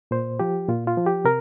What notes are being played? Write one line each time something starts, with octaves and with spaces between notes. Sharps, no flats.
A#2 C5
F3 G4
A#2 F4
F4
F3
G4
C3 A#4